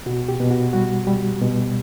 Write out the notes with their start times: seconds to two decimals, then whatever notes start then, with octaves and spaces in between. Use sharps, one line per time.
0.06 B2 F#4
0.28 G4
0.40 B2
0.51 F#4
0.73 G3 F#4
1.07 G3 G4
1.41 B2